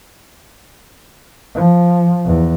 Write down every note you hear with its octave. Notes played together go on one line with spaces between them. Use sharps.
F3
E2